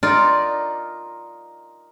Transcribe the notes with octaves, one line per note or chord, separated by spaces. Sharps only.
D#4 F4 A#4 D5